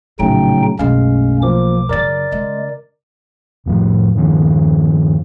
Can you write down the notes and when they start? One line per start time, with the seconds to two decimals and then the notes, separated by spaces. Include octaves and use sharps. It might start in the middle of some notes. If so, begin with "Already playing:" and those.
0.19 A#1 A2 C#3 F#3 A3 C#4 D#4 G5
0.79 B1 F#2 G#3 A3 C#4 F5
1.42 F3 A#3 D6
1.89 F#2 C#3 A#4 D5 A6
2.32 C#3 G#3
3.66 F1 A2 F3
4.16 G2 D#3 F3 C#4